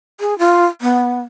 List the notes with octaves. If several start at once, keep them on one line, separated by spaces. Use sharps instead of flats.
G#4
F4
B3